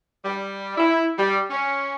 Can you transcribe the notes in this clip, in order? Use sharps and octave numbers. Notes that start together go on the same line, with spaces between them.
G3
E4
G3
C#4